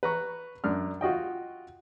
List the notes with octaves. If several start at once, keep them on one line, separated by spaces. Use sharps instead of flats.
B4 A#5 C#6
F#2 D4 F6
F4 F#4 D#5 G5